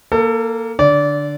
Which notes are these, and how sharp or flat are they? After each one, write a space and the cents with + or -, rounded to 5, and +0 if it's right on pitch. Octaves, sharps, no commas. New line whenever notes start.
A#3 +0 A4 +25
D3 +5 D5 -25